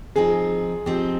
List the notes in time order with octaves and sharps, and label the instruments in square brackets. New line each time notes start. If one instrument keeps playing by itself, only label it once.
[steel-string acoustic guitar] F3 C4 D#4 [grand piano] G#4
[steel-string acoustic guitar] F3 C4 D#4 [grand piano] G4